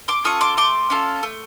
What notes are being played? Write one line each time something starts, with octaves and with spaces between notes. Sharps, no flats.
C6 D6
C#4 F4 A4 C#6 D#6
C6 D6
A3 C6 D6
C#4 F4 A4
A3